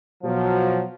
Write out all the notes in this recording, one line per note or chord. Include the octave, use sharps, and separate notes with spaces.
B2 F3 F#3